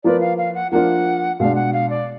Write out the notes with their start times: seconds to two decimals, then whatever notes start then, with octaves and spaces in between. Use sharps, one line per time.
0.04 F3 A#3 F4 B4 D5
0.20 F5
0.38 F5
0.55 F#5
0.72 F3 A#3 D4 F4 F#5
1.39 B2 G#3 D4 F5
1.55 F#5
1.73 F5
1.90 D5